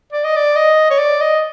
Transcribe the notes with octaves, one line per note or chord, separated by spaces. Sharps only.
D5
D#5
D5
D#5
C#5
D5
D#5